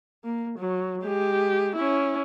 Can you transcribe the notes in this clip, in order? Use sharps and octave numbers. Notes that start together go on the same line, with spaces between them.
A#3
F#3
G#3 G4
C#4 E4